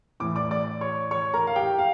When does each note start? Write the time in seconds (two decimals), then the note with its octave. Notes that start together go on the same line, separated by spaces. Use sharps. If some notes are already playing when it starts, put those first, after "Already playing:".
0.20 A2 E3 D6
0.36 D5 D6
0.51 D5 D6
0.81 C#5 C#6
1.11 C#5 C#6
1.34 A#4 A#5
1.47 F5
1.56 G4 G5
1.79 F5